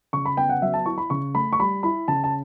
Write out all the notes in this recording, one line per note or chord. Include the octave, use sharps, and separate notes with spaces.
C#3 C#6
B5
B3 G5
F#5
F#3 E5
A5
E4 C#6
B5
C#3 C#6
A3 B5
C#6
G3 B5
E4 B5
C#3 A5
A5